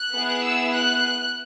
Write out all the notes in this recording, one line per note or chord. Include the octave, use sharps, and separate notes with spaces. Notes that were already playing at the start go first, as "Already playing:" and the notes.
Already playing: F#6
B3 E4 G#4
E6
F#6